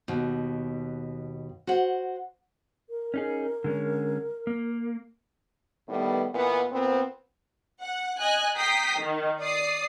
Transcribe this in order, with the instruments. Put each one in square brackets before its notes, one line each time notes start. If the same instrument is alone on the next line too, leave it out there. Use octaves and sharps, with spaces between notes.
[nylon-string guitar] D#2 B2
F#4 C5 F#5
[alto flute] A#4
[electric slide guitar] C#4 D#4 G#4
D3 G#3 C#4
A#3
[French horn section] A2 D#3 G3 B3
A#2 E3 B3
A#2 B3 C4
[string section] F#5
D#5 G#5 F#6
G5 A#5 D#6 B6 C7
D#3
D5 D#6 C7